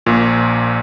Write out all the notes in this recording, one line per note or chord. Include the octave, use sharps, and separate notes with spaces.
A#1 A#2